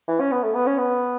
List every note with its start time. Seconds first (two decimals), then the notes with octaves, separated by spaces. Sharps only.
0.08 E3
0.20 C#4
0.32 B3
0.43 A3
0.55 B3
0.67 C#4
0.78 B3